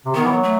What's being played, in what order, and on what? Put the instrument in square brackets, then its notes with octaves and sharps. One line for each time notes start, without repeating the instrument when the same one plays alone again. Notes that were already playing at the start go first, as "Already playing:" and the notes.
[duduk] C3
[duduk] D#3 [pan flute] B3
[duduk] E3
F#3
[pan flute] A3